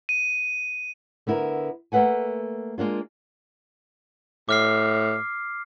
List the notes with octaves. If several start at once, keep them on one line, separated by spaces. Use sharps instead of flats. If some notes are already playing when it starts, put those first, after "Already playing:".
D#7
D3 B3 E4 A#4
A3 A#3 A4 B4 F#5 G#5
G#3 A#3 D4 F4
A2 D6 F6 C7